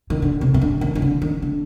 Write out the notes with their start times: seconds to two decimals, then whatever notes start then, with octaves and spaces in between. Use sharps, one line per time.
0.10 D#3
0.22 D3
0.41 C3
0.54 C3
0.61 D3
0.81 D#3
0.95 D#3
1.02 D3
1.22 D#3
1.42 D3